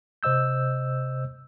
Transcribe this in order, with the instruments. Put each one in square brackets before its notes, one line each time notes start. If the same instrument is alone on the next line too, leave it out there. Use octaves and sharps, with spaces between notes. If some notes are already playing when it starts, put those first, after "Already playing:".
[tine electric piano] C3 C5 D#5 E6 G6